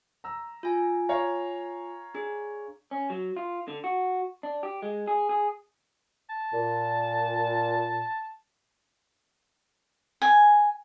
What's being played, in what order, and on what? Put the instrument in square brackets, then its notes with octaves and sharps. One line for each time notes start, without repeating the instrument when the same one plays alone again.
[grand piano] A#5 E6
[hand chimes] F4 G#5
[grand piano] C#5 F5 A#5
[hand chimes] D4 G#4
[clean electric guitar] C#4
F#3
F4
D3
F#4
D4
G4
G#3
G#4
G#4
[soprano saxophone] A5
[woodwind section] A#2
[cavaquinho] G#5